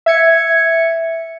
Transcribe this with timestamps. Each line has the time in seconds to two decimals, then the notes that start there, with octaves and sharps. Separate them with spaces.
0.06 E5 G#6 C#7